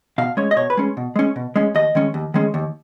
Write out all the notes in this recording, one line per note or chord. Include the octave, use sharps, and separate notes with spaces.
B2 F5
G#3 C#4 C#5
D#5
B2 C#5
B4
G#3 C#4
B2
G#3 C#4
B2
G#3 C#4
D#2 D#5
D#3 G#3 C#4
D#2
D#3 G#3 C#4
D#2